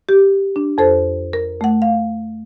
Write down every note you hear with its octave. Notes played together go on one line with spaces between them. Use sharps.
G4
D4
F2 A4 C5
A#4
A3 F#5
F5